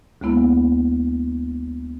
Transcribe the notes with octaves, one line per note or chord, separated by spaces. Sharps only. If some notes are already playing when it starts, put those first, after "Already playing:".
D2 G#3 A#3 B3 E4 B5